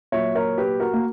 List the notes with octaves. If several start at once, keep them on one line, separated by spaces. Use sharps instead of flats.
A#2 F#3 C#5 E5
A#4 C#5
G4 B4
F#4 A#4
A#3